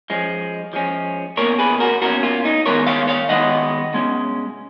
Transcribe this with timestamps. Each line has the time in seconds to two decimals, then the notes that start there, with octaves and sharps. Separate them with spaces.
0.10 F3 G#3 C#4
0.73 F3 G#3 C#4
1.37 B2 A#3 C#4 A#4 C#5
1.59 G#4 B4
1.80 F#4 A#4
2.02 B2 A#3 C#4 F#4 A#4
2.23 F4
2.45 D#4
2.66 D#3 G#3 B3 A#4 C#5
2.86 C#5 F5
3.08 C#5 F5
3.29 D#3 G#3 B3 D#5 F#5
3.94 B2 G#3 C#4